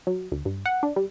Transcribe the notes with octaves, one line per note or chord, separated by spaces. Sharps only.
F#3
D2
G2
F#5
D4
G3